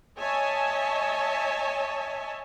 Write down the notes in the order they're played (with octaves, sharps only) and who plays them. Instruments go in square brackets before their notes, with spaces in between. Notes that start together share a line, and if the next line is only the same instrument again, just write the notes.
[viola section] C#5 D#5 E5 G#5 A5